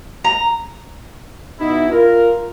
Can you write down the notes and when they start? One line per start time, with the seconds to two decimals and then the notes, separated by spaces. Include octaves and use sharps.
0.24 A#5
1.58 B2 D#4 E4
1.90 F4 A#4